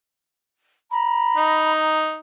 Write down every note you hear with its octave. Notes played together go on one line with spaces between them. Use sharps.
A#5 B5
D#4